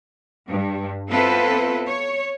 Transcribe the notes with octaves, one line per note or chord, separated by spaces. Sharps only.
G2
B3 C4 E4 F4 A4 B4
C#5